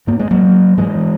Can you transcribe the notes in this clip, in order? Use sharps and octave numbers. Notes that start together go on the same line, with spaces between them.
G#2 A#3
G#3
F#3 A#3
G#2 E3 G#3